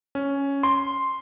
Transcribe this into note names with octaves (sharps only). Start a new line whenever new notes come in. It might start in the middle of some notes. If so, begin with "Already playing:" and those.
C#4
C6